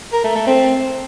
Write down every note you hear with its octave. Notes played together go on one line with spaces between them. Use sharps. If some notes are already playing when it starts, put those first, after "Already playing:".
A#4
A3
A3
C4